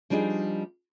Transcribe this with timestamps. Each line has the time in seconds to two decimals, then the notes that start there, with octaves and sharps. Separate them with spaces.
0.10 F3 G3 D4 D#4 G#4